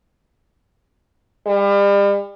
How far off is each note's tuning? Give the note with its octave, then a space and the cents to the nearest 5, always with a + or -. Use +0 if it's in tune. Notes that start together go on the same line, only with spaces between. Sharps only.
G3 +35